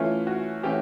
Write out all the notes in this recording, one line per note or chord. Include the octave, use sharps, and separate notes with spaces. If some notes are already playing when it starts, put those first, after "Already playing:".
Already playing: E3 A3 C#4 F4
F#4
E3 A3 C#4 G4